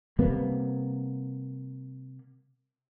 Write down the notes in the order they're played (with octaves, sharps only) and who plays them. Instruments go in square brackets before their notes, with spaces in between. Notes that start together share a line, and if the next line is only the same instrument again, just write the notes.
[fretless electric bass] C3 G3 A#3 B3